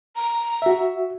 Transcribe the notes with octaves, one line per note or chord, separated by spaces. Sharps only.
A#5
F#4 E5